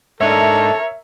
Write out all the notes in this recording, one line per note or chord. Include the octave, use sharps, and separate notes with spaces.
G#2 D4 D#4 A4 A#4 C#5 E5